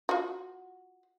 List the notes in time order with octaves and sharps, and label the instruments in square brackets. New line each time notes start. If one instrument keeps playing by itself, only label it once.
[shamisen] F4 F#4